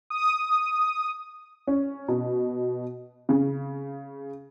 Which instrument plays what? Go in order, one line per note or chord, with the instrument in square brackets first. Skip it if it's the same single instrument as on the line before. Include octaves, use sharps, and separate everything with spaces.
[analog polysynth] D#6
[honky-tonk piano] C#4
B2
C#3